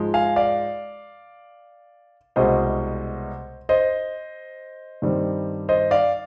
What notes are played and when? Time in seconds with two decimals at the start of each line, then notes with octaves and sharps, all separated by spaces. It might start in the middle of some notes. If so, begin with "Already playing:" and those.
Already playing: G#2 F3 G#3
0.14 F5 G#5
0.36 D5 F5
2.36 C2 B2 G#3 C4 C5 D#5
3.69 C5 D#5
5.02 G2 D#3 G3 C4
5.69 C5 D#5
5.91 D5 F5